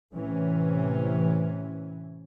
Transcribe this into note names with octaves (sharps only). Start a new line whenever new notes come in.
A2 C3 E3 C#4